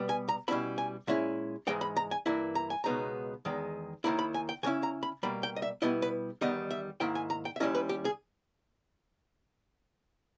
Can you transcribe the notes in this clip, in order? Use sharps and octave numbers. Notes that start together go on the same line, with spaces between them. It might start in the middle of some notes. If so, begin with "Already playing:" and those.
Already playing: B2 G3 B3
G#5
A#5
B2 G3 C#4 E4 B5
G#5
A#2 G#3 C#4 E4 E5
G#2 E3 G#3 D#4 G5
B5
A#5
G#5
G2 E3 A#3 E4
A#5
G#5
C#2 B2 G#3 B3 D#4 A#5
E2 D#3 G#3
D#2 D#3 A#3 E4 B5
B5
G#5
G5
C#3 G#3 C#4 E4 G#5
A#5
B5
B2 G3 A#3 B5
G5
D#5
E5
B2 G3 B3 E4 D#5
B4
E2 D#3 G3 B3 D#4 D#5
E5
G#2 D#3 A#3 E4 G5
G#5
A#5
G5
E5
D#2 D#3 G3 C#4 E4 D#5
B4
G4
G#4